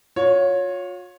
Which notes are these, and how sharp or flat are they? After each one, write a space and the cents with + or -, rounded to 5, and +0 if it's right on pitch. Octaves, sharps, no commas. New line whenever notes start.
F4 +40 C#5 +0